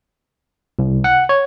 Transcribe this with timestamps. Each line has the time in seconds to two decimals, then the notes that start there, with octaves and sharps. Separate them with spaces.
0.79 C2
1.04 F#5
1.29 C#5